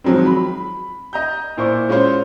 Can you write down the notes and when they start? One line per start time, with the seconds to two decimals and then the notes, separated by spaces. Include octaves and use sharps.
0.04 D#3 F3 F#3 G#3 C4
0.26 B5
1.13 D#5 A#5 G6
1.57 A#2 E4 C5 D5 C#6
1.89 G#3 C#4 F4 C5 C#5